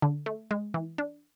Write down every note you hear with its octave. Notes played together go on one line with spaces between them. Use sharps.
D3
A3
G#3
E3
D4